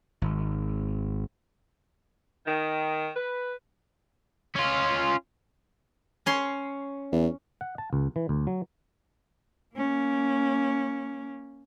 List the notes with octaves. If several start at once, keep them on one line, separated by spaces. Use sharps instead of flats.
G#1
D#3
B4
C#4 F4
C#4 C#5 C6
E2
F#5
A5
C#2
E3
D2
F#3
A#3 C#4